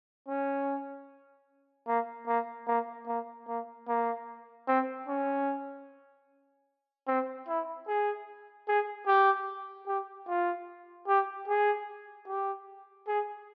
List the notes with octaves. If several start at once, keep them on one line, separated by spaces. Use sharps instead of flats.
C#4
A#3
A#3
A#3
A#3
A#3
A#3
C4
C#4
C4
E4
G#4
G#4
G4
G4
F4
G4
G#4
G4
G#4